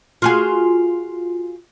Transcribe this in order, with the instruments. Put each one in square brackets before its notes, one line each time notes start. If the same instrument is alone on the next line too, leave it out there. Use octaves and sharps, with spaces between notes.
[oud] F4 F#4 G#4